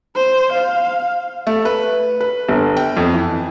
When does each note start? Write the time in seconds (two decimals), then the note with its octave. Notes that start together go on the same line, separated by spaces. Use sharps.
0.15 C5
0.52 F5
1.47 A3
1.65 B4
2.21 B4
2.48 G1
2.77 G5
2.97 F2
3.14 E3